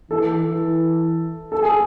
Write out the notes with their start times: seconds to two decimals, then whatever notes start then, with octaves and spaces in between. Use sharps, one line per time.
0.10 E3 A4
0.45 E3
1.52 A4
1.62 G#4